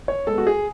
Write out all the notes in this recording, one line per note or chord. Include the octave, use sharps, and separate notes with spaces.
C#5
G#3 B3 A4
F#4
G#4